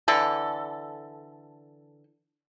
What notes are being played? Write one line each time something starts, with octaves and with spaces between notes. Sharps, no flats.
D3 E3 A4